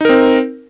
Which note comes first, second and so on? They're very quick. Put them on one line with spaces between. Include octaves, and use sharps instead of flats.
D#4 A#4 C4